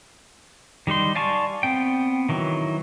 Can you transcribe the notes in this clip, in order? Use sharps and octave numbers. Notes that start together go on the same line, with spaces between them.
D#3 G3 D#4 C6
D5 F5 G#5 A5 C#6
B3 C4 G5
D#3 E3 F#3